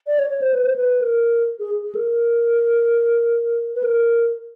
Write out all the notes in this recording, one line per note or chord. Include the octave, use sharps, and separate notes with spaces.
D5
C#5
C#5
C5
B4
C5
B4
A#4
G#4
G#4
A#4
B4
A#4